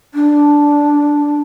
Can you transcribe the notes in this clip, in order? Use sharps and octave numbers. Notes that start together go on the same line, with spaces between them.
D4